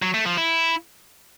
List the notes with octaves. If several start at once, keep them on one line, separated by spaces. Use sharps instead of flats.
F#3
A3
F3
E4